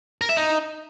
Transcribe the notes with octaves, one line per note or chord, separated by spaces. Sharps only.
A#4
E5
D#4